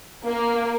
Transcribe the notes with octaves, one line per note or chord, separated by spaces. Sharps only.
A#3